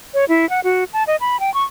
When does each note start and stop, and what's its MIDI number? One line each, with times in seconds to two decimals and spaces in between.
0.14 0.25 73
0.29 0.49 64
0.50 0.60 78
0.64 0.84 66
0.93 1.04 81
1.07 1.16 75
1.21 1.40 83
1.40 1.53 79
1.54 1.64 85